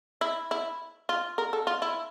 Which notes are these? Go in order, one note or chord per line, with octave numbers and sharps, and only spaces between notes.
E4
E4
F4
A#4
A4
F4
E4